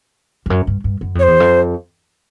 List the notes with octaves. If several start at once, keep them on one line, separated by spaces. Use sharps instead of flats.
F2
F#2
G2
G2
F#2
F2 C#5
E2 C5
F2